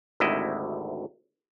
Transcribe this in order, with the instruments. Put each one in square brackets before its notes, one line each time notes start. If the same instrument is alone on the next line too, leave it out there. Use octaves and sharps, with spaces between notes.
[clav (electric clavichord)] G#1 D2 C3 E4 D#5